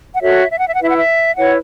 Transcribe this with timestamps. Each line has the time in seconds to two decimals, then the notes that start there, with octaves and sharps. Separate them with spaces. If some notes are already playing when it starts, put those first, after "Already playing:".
0.14 F#5
0.22 F#4 A4 C#5 E5
0.52 E5
0.58 F#5
0.67 E5
0.75 F#5
0.80 E4 B4 E5
0.91 F#5
0.98 E5
1.38 E4 B4 C#5 F#5